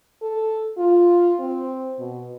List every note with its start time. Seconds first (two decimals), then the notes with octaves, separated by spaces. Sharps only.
0.22 A4
0.78 F4
1.40 C4
1.99 B2